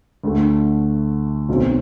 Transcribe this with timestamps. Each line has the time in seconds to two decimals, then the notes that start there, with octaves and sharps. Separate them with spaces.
0.24 D2 D3 A3
1.49 B1 B2 F#3 C4